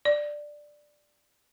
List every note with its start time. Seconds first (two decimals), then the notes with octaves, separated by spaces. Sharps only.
0.05 D5